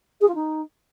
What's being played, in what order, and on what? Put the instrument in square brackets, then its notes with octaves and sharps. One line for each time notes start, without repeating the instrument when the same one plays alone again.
[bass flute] G#4
F4
D#4